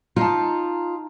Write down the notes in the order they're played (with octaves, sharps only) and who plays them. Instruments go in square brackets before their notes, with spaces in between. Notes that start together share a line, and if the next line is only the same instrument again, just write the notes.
[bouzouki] D#4 F5 A5 [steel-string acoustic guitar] F4